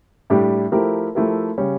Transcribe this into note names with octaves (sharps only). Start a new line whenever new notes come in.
A2 G3 D4 G4
F3 A3 E4 G4 A#4
F3 A3 E4 G4 A#4
C#3 G3 C#4